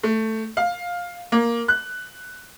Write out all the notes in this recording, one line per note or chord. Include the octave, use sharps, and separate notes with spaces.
A3
F5
A#3
F#6